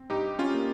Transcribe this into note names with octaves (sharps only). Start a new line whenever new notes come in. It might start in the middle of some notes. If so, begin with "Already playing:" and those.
Already playing: C4
G2 D#4 G4
C#4 F4
A#3